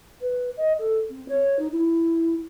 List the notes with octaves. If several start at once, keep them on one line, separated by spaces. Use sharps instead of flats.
B4
D#5
A4
C4
C#5
D#4
E4